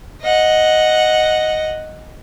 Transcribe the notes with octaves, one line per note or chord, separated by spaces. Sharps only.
D#5 F#5